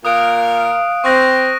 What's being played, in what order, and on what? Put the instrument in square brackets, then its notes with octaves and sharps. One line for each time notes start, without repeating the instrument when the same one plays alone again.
[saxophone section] A#2 A#4 [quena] F5 [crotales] D#6 F#6 D7
[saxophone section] C4 [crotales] C#6 F#6 A#6